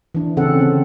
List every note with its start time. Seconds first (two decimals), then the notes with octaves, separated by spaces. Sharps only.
0.15 E3 D4
0.37 C#3 C4 C#4 A4 F#5
0.59 D3 C4